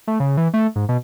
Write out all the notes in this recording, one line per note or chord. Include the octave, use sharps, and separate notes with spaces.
A3
C#3
E3
A3
G#2
B2